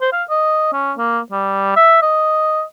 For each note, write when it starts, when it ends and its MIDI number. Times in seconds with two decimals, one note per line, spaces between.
0.01 0.10 72
0.13 0.24 77
0.30 0.69 75
0.73 0.93 61
0.97 1.20 58
1.32 1.73 55
1.76 2.02 76
2.02 2.63 75